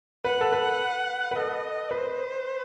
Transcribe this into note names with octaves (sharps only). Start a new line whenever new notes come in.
B4 F#5
A4
B4
B4
A4 D#5
B4 C5